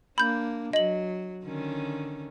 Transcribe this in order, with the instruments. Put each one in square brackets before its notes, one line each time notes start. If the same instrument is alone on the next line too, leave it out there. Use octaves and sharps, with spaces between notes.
[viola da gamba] A#3 D4 [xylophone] B5 G6
[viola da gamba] F#3 [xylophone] D#5 F#7
[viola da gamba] D3 D#3 C#4